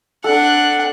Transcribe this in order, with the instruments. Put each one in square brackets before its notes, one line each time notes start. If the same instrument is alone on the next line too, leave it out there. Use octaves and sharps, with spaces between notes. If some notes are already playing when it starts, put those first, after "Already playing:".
[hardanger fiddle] D4 F#5 [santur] A4